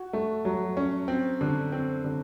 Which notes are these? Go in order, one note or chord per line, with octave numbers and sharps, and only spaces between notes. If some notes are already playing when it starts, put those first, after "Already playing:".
Already playing: F#4
A3
F#3
C#4
C4
D3
C4
D3